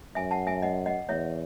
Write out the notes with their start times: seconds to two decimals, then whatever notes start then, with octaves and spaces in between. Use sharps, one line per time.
0.15 F#2 E5 G#5
0.31 F#5 A5
0.47 E5 G#5
0.62 D#5 F#5
0.86 D#5 F#5
1.09 E2 C#5 E5